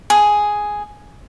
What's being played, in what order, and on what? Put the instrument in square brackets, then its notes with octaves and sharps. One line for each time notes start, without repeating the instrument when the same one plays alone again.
[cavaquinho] G#4